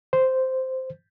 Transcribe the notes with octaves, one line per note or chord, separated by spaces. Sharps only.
C5